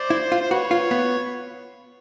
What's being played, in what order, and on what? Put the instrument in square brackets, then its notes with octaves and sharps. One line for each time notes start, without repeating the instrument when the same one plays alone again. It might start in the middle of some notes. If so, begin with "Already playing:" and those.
Already playing: [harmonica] C5 D5
[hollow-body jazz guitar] E4
F4
[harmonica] C5
[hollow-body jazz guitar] F#4 [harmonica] B4 C#5
[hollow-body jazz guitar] F4
B3